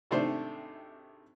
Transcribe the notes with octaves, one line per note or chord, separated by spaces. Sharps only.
G#1 C3 D#3 A3 D4 C5